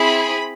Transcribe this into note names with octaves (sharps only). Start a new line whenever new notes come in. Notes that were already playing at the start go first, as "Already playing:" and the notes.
Already playing: C4 E4 G#4 B5